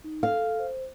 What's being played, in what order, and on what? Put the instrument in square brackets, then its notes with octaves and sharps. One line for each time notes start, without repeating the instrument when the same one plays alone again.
[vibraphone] D#4
[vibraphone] A4 [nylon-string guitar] F5
[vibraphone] C5